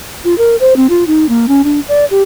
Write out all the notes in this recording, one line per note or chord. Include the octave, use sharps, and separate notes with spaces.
F4
A#4
C5
C4
F4
D#4
A#3
C#4
D4
D5
G4